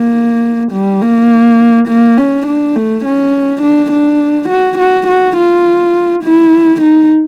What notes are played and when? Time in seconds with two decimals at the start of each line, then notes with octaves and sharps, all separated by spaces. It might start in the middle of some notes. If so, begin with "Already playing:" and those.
Already playing: A#3
0.72 G3
1.02 A#3
1.88 A#3
2.17 C#4
2.46 D4
2.76 A3
3.05 C#4
3.62 D4
3.91 D4
4.49 F#4
4.78 F#4
5.07 F#4
5.37 F4
6.24 E4
6.82 D#4